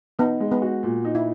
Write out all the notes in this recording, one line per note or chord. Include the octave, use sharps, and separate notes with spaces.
B3 D#4
G#3
B3
F#4
A#2
D#4
E4